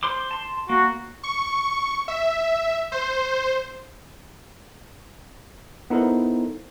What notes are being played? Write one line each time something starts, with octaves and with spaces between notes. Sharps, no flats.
C5 C6 D6
A5 C6
A#3 F#4
C#6
E5
C5
B3 D#4 E4 A4 A#4 C5